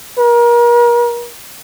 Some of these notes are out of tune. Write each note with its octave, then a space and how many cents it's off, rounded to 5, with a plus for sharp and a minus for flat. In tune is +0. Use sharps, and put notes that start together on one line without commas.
A#4 +35